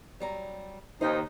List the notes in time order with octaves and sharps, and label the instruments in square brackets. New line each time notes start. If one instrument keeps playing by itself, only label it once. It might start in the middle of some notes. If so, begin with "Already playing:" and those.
[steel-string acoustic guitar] F#3 G3 A#5
[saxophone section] D#2 D#4 [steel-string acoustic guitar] C5 D#5 G5